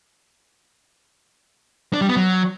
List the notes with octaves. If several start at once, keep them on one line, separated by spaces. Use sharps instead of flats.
D4
G3
B3
F#3